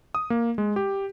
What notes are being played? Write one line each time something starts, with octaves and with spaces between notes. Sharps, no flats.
D#6
A#3
G#3
G4